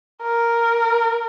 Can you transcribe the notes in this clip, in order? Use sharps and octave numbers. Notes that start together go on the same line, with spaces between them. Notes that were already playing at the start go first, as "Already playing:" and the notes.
A#4